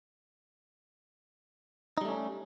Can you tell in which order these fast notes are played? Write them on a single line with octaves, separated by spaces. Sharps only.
D#4 G3 A3 C#4